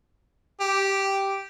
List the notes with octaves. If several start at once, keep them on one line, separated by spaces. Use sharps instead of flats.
G4